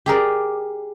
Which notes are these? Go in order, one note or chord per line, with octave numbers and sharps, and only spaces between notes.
G4 G#4 A#4 D5